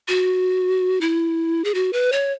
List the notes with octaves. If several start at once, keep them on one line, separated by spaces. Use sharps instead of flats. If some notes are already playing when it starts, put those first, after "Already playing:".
F#4
E4
G#4
F#4
B4
C#5